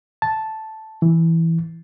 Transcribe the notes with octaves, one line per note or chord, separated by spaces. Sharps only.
A5
E3